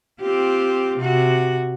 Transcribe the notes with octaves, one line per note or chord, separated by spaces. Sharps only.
C4 F4 G4
C3 F#4